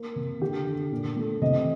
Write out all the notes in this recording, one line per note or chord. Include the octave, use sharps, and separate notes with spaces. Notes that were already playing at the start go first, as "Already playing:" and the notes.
Already playing: A#3
C3
D3 G4
D3
A#2
A3
C3 D#5